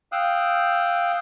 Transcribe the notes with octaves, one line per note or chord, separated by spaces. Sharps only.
F5 G5 D#6 E6 F#6